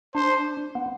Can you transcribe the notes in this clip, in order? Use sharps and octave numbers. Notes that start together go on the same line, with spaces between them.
D4 C5
B3